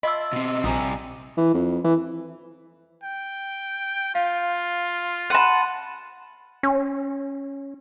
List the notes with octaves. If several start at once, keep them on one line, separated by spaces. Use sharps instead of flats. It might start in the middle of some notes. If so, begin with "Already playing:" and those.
F4 D#5 E5 A5 B5 E6
B2 C4
A#1 C3 G3 C4 G#5 A#5 D#6
E3
F2
E3
G5
F4 F5
F#5 A5 B5 C6 D#7
C#4